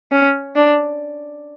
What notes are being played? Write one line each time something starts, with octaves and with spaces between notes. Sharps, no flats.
C#4
D4